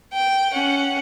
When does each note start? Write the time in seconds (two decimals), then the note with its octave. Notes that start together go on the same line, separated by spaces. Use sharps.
0.13 G5
0.52 C#4 F#5